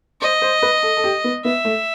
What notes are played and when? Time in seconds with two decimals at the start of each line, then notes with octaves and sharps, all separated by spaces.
0.21 C5 D#5
0.42 C5
0.62 B4
0.83 A4
0.97 A4
1.04 G4
1.24 B3
1.44 B3 E5
1.65 A3